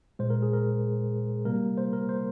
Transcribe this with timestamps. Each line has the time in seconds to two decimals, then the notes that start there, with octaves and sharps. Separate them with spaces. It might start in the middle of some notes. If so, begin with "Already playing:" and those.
0.19 A#2 G#3 C5
0.30 A#4
0.42 G#4
0.53 A#4
1.45 C3 G3 A#3 A#4
1.78 C5
1.93 A#4
2.09 C5